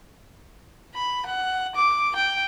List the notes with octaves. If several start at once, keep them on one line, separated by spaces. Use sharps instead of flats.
B5
F#5
D6
G5